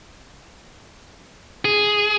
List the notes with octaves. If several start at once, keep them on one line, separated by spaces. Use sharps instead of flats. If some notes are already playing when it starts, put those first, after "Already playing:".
G#4